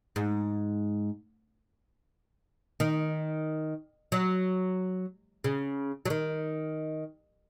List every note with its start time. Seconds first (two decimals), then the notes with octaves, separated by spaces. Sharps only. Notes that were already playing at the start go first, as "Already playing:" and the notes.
0.16 G#2
2.80 D#3
4.12 F#3
5.44 C#3
6.05 F#3
6.10 D#3